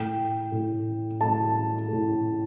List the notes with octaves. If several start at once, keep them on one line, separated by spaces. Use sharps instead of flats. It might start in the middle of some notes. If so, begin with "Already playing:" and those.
Already playing: A2 A3 G5
A2 A3
A2 A3 A5
A2 A3